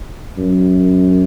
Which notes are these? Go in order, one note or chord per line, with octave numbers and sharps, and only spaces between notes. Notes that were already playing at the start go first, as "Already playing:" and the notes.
F#2